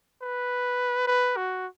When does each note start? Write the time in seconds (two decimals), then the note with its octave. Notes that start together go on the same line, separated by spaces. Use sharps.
0.22 B4
1.07 B4
1.37 F#4